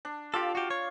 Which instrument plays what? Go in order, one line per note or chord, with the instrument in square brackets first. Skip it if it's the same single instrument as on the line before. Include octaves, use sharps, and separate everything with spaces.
[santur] D4
[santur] F4 D5 F5 [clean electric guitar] G4 A4
[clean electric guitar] F#4 G4
C#5